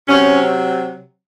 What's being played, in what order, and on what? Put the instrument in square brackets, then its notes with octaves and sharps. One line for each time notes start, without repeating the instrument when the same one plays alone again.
[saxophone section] C3 F#3 C4 C#4